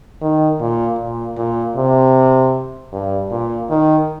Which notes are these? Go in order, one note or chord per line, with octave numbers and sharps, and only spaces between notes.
D#3
A#2
A#2
A#2
C3
G2
A#2
D#3